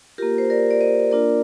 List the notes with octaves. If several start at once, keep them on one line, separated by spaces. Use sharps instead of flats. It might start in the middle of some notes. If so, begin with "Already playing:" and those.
A#3 F4 G4 A#4
C5
A#4 D5
D5
C5 D#5
A#3 D4 F4 A#4 D5